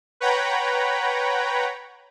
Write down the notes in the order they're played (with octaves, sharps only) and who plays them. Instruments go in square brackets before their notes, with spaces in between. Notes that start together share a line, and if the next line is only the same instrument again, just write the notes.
[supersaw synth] B4 C#5 F#5 G5 A#5 B5